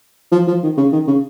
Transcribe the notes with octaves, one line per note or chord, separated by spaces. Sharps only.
F3
F3
D#3
C#3
D#3
C#3